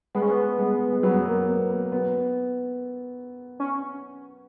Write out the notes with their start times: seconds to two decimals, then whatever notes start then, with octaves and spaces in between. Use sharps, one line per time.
0.15 G#3 B3
0.22 C#4
0.31 B3
0.59 G#3
0.92 G#3
1.03 F#3 B3
1.26 A#3
1.48 B3
1.70 A#3
1.92 B3
3.60 C#4